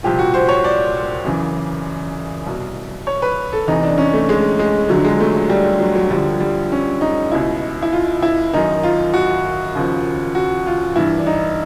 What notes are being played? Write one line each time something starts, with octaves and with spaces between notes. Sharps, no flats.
C2 A#2 F3 G4
F#4
C5
C#5
D5
F#2 C#3 E3
C2 B2
C#5
B4
A4
E2 C3 E3 D#4
D4
C#4
A3
G#3
G#3
D2 D3 F3 F#3
G#3
A3
G3
F#3
F#3
D2 D3 F3 G3
G3
C#4
D#4
C#2 B2 E4
E4
F4
E4
F#2 D#3 D#4
F4
F#4
D#2 C#3 F3
F#4
F4
G2 E3 E4
D4
D#4